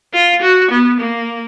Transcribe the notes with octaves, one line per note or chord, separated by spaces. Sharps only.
F4
F#4
B3
A#3